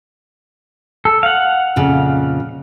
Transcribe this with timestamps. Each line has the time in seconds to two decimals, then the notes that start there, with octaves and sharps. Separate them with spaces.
1.05 A4
1.23 F5 F#5
1.76 F2 A#2 C#3